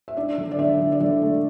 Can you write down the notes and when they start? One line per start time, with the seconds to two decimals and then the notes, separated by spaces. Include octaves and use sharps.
0.08 E5
0.17 D4 D5
0.38 D3
0.51 D5
0.59 D3 E5
0.80 D3
0.92 D5
1.01 D3 E5
1.21 A3